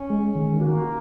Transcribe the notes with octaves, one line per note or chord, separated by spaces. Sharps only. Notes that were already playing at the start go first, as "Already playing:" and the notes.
Already playing: C#4
G#3
D#3
A#3 F#4